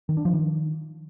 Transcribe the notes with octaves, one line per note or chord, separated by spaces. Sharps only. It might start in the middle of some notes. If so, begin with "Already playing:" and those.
D#3
D4
F3
D#3